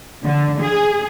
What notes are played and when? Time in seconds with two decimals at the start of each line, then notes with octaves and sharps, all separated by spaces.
0.24 D3
0.60 G#4